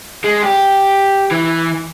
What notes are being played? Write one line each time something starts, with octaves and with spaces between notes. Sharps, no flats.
G#3
G4
E3